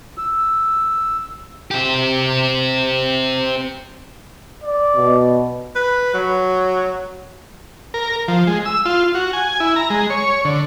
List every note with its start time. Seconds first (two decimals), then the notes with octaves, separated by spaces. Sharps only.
0.18 E6
1.71 C4 G4
4.64 D5
4.96 B2
5.75 B4
6.14 F#3
7.94 A#4
8.28 F3
8.47 G#3
8.65 E6
8.85 F4
9.15 F#4
9.33 G#5
9.60 E4
9.76 A#5
9.90 G#3
10.10 C#5
10.45 D3